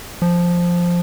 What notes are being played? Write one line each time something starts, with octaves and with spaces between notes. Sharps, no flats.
F3